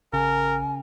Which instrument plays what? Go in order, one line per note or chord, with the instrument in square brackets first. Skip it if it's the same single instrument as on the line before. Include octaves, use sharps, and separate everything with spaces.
[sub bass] A1 [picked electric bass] C#3 [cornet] A#4 [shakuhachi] G#5